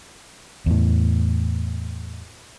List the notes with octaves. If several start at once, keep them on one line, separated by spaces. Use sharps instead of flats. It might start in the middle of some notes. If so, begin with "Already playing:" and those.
E2 A2